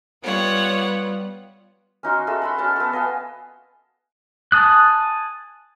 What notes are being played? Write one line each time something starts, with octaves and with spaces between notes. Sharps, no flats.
G3 B3 F4 C#5 F#5
C#4 D#4 F#4 C6
F#4 G#4 A4 E5
F#5 B5 C6
C#4 F#4 A5
B3 A4
D#5 F5 G#5 B5
G#5 A5 D#6 F#6